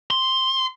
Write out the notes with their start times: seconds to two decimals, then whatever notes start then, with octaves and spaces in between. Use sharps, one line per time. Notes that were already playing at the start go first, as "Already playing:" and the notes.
0.10 C6